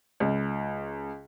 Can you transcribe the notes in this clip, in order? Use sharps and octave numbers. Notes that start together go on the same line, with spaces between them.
C#2